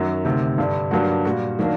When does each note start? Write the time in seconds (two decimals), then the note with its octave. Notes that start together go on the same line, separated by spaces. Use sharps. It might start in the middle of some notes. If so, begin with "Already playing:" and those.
Already playing: F#2 D#3 F#3
0.25 D2 C3 D#3
0.58 G2 D3 G3
0.91 G2 F#3 A#3 D4 F#4
1.25 A#2 G3 A#3 F#4
1.59 D#3 F#3 A#3 D4